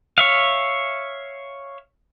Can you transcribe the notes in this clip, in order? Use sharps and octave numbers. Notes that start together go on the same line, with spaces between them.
C#5 E5 F5